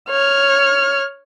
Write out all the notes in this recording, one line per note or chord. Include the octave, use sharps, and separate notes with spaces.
C#5 F6